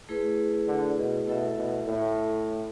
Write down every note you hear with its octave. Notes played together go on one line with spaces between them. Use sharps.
A3 E4 G#4 B4
D3
B2
B2 A3 E4 A4 E5
B2
A2